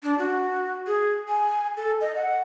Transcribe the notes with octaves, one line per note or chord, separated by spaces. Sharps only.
D4
F#4
G#4
G#5
A4
D#5
F#5